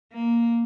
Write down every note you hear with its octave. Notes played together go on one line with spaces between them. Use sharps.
A#3